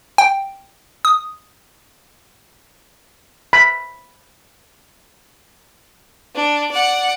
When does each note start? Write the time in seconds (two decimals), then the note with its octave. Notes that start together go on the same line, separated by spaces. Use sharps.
0.18 G5
1.05 D#6
3.53 B5
6.35 D4
6.72 D5 F#5